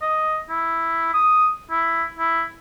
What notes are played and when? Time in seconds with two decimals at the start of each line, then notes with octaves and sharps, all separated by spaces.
0.02 D#5
0.50 E4
1.14 D#6
1.71 E4
2.19 E4